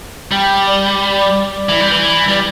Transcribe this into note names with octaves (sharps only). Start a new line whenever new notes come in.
G3 G5
D5
E3
G3
E3
G3 D5